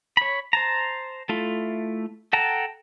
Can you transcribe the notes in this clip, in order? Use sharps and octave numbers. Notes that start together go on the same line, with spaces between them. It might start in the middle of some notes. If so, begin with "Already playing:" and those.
C#5 B5
C5 A5 A#5
A3 E4 F4 A4
A4 F#5 G5 A5 A#5